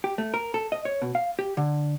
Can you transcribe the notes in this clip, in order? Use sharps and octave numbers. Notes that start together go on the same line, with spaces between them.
G4
A3
A#4
A4
D#5
C#5
B2
F5
G4
D3